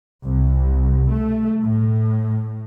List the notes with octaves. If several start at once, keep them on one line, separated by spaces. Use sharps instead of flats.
C2
A3
A2